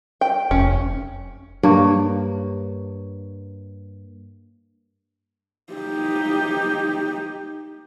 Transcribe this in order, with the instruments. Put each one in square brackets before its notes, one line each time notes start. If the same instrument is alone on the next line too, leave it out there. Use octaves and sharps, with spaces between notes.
[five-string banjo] G5
[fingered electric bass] F1 [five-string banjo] C#4
[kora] G2 A#3 C#5
[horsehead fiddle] D#4 G4